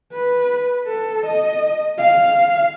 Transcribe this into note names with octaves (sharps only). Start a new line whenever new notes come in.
B4
A4
D#5
F5